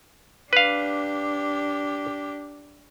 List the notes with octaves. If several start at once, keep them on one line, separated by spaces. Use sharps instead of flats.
D4 G4 B4 F5